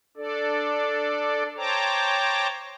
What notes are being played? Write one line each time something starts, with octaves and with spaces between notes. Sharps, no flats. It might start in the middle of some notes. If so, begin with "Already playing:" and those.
D4 A4 D5
C5 C#5 G5 A5 A#5 D6